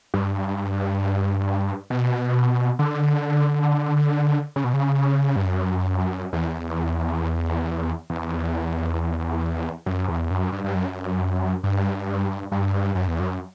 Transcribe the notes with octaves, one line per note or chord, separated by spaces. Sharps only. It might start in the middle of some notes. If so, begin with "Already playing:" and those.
G2
B2
D3
C#3
B2
C#3
G2
F#2
E2
E2
F#2
E2
F#2
G2
G2
F#2
G2
G2
F#2
E2
F#2